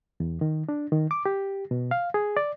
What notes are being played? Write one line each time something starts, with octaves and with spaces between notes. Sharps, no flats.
E2
D#3
D4
D#3
D6
G4
B2
F5
G#4
D5